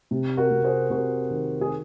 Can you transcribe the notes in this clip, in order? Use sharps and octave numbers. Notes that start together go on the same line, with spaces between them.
C3
F#4 A#4
C3
G#4 C5
C3 F#4 A#4
D#3
G#4